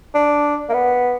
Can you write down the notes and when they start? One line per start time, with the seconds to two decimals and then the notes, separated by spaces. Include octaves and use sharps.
0.14 D4
0.69 A#3
0.73 B3